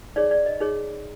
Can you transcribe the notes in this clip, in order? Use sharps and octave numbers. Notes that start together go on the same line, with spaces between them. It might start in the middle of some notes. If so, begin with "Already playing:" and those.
D#4 G#4 C#5 D5
D5
D#5
D#4 G#4 C#5